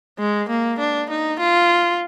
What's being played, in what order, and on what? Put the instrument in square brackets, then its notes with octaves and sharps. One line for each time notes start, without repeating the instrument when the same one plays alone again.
[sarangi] G#3
A#3
D4
D#4
F4